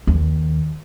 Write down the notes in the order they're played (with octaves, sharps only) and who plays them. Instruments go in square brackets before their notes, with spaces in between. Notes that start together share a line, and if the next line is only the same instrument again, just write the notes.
[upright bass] D#2